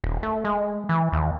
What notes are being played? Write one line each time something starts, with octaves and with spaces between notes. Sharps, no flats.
D#1
A3
G#3
E3
D#2